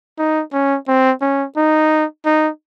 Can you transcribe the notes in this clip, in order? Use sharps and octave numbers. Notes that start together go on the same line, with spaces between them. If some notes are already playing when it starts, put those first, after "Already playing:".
D#4
C#4
C4
C#4
D#4
D#4